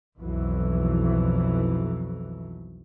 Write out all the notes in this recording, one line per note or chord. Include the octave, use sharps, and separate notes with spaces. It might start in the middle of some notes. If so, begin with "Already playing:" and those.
B1 F2 E3 F#3